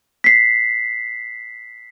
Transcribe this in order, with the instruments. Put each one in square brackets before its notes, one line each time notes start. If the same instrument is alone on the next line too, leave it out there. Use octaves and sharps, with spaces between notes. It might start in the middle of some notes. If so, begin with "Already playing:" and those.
[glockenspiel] B6 C7